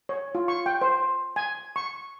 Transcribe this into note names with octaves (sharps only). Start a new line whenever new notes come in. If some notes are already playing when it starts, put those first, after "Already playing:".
C#5
F4
C#6
G5
C5
G#5
C#6